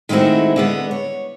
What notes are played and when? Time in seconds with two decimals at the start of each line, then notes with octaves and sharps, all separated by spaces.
0.09 D#3 G#3 A3 C4 E4 F#4
0.56 D3 G#3 B3
0.91 C#5